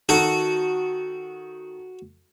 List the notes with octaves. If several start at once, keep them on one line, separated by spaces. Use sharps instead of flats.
D#3 F#4 A4